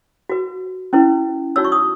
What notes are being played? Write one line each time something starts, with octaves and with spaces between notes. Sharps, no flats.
F#4 B4
C#4 E4 B4
D#4 F#4 C#5 E6
C#6
D#6